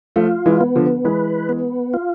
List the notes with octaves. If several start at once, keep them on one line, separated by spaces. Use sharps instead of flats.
F3 A3 F4
E3 G#3
B3
D3 F3
E3 G#3 B4
B3
F4